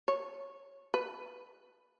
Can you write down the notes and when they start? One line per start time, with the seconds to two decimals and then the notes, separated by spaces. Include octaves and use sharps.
0.08 C#5
0.94 B4